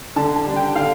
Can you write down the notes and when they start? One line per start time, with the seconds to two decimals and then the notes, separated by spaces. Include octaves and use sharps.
0.16 D3 A5
0.36 A5
0.45 G3 D4
0.56 G5
0.75 D3 F5